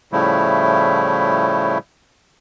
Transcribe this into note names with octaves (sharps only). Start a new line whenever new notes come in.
A2 C#3 F3 G3 A3 E4